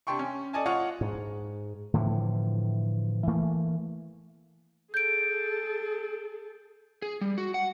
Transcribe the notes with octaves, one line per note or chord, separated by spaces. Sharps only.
C3 D4 G5 C6 C#6
C#4
A4 D5 D#5 G#5 A5
F4 C#5 D#5 F#5 C#6
G#2
A2 D3 E3 F3
E3 A3 A#3
G#4 A4 G6 D7
G#4
G3
F#4
F#5